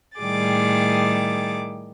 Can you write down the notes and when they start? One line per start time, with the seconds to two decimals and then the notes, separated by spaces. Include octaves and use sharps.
0.18 A2 D#3 G3 G#4 D6 A6